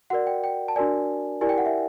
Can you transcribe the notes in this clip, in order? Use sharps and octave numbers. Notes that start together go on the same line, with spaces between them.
F#4 A#4 D5 F#5
G5
G5
A5
D4 F#4 A#4 D5 G#5
E4 G4 A#4 D5 G#5
G5
F#5
E5